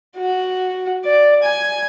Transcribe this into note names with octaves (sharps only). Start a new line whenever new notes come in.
F#4
D5
G#5